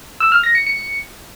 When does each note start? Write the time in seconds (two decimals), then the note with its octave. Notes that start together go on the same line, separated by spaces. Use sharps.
0.20 E6
0.32 F6
0.43 A#6
0.55 C#7
0.67 C#7